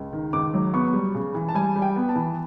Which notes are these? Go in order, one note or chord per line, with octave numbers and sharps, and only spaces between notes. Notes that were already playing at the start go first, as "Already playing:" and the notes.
Already playing: C#2
D#3
C#2 D6
F#3
B3 C#6
G3
C#3
E3
A5
G3 G#5
G3
G5
B3
A5
E3